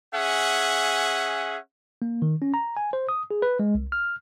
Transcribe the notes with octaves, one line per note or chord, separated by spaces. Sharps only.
C#4 G#4 E5 F#5
A#3
D#3
C#4
A#5
G#5
C5
D#6
G#4
B4
G#3
C2
F6